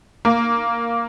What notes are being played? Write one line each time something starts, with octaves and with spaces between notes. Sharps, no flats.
A#3